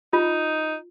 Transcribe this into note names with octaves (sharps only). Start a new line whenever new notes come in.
D#4 F4